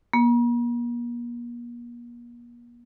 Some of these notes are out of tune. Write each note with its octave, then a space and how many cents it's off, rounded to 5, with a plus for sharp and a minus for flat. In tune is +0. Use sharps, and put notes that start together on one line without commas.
A#3 +40